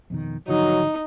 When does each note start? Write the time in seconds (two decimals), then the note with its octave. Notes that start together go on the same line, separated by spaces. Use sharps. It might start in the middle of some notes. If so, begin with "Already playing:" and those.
0.10 F2 B2 D#3
0.48 G#1 D3 F3 F#3 D#4